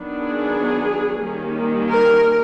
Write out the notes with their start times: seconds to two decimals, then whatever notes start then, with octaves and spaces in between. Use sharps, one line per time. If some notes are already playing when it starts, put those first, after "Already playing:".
Already playing: D#3 F#3 B3 D4
0.21 G#4
1.22 D#3 G3 A#3 C#4
1.89 A#4